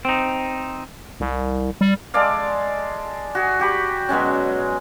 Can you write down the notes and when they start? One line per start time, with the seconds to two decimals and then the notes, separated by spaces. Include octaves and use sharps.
0.05 C4 D#4
1.20 C2
1.81 G3
2.14 G#3 A4 D5 F5
3.35 F#4 G#4
3.60 F#4 G4 B5
4.09 B2 F#3 G#3 C#4